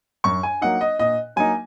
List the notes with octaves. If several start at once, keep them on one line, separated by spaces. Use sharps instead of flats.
F#2 C#6
G#5
F#3 A#3 D#4 F#5
D#5
A#2 D#5
F#3 A#3 D#4 G#5